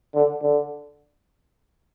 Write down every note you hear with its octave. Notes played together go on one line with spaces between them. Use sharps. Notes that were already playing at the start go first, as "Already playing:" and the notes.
D3
D3